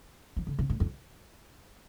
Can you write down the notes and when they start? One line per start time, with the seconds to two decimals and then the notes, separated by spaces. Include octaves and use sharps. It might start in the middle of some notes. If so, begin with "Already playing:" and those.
0.37 F3
0.47 D3
0.59 C3
0.70 A2
0.80 F2